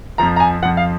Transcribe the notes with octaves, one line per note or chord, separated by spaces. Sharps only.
F2 F3 A#5
A#5
G#5
F2 F3 F#5
F5